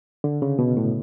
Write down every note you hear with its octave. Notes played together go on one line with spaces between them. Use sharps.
D3
C#3
B2
A2